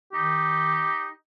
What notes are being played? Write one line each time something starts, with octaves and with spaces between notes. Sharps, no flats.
D#3 D#4 G4